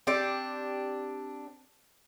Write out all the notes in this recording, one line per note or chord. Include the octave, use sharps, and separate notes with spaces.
C4 D4 G4 D5